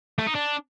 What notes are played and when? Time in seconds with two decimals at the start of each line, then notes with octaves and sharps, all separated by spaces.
0.18 A3
0.27 D#4
0.35 D4